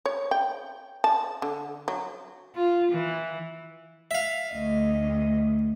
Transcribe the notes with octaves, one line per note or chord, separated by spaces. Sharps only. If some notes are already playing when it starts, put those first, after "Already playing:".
C#5
G5
A5
D3
F#3
F4
E3
E5 F5
D2 D#5